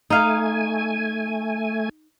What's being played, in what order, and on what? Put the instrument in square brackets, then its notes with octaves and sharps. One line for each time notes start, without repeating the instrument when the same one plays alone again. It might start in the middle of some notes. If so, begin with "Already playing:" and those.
[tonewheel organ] A3 G#5 [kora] D#4 F5